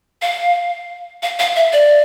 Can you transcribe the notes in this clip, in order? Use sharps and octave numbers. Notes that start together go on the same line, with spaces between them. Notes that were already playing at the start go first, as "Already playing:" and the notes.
F5
F5
F5
E5
D5